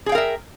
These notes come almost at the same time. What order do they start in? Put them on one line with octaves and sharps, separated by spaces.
G#4 G5 F5 A#4 E5